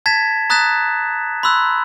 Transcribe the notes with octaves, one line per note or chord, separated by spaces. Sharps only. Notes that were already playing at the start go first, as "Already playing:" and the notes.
A5 G#6 A6 B6 E7
A#5 D#6 F#6 A6 B6 E7
B5 C6 E6 F#6